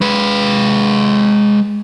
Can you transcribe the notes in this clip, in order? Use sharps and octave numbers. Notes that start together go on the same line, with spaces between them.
G#3 B4